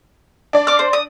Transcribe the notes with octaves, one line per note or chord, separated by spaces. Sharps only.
D4 D5
D6 F6
C5
D#6